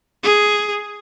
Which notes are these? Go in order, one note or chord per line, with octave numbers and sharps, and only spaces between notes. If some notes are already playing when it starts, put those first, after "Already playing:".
G#4